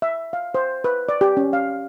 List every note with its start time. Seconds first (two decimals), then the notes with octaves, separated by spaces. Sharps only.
0.02 E5
0.33 F5
0.55 C5
0.84 B4
1.09 D5
1.21 G4
1.37 C#4
1.53 F5